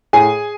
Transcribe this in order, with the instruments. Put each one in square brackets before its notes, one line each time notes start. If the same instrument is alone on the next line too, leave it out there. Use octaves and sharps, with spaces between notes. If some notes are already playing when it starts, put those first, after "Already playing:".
[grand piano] A2 G#4 G#5